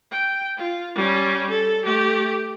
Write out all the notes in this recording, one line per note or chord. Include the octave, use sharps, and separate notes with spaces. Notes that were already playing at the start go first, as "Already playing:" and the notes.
G5
F4
G3 C#4
A4
A3 G4